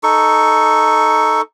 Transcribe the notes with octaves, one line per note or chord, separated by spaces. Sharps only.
D#4 A4 C#6